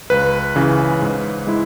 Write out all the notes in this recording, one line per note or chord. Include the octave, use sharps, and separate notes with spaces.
C#2 B4
C#3 E3 C#4
G#2
G#3 E4